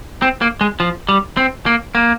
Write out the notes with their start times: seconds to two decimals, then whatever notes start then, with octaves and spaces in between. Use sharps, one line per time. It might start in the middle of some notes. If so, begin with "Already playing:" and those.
0.22 C4
0.41 A#3
0.61 G#3
0.80 F3
1.09 G3
1.37 C4
1.66 A#3
1.95 A#3